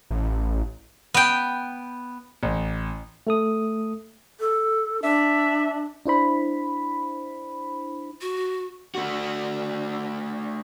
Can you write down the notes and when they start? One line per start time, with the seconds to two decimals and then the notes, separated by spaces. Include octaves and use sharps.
0.11 A1
1.14 B3 G5
2.43 A1
3.27 A3 A4 D#6
4.40 A4
5.02 D4 E5
6.06 D4 E4 C5 B5
8.21 F#4
8.95 A3 F#4